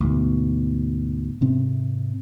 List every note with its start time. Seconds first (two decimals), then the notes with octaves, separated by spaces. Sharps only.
0.01 D2 G#2 B2
1.41 G#2 C3 C4